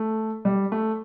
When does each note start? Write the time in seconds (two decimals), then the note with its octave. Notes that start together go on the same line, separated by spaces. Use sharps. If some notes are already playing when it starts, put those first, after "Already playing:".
Already playing: A3
0.45 G3
0.72 A3